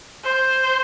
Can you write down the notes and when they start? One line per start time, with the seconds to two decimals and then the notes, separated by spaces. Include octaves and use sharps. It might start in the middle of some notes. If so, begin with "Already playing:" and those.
0.24 C5